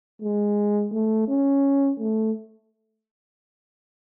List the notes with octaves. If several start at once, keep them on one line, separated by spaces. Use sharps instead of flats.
G#3
A3
C#4
A3